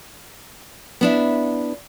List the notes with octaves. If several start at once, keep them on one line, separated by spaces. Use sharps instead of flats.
B3 D4 E4